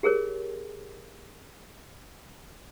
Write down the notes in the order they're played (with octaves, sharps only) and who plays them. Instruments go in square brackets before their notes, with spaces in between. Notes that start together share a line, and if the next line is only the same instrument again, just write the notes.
[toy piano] G4 G#4 A#4 C#5